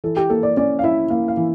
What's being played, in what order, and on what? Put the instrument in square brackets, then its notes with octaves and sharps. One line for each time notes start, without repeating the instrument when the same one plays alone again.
[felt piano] E3 [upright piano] A4
[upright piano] G4
[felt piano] A#3 [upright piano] A4
[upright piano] D5
[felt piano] C#4 [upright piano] D5
[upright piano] F5
[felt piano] E4 [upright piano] E5
[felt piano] A#3 [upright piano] F5
[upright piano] F5
[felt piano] E3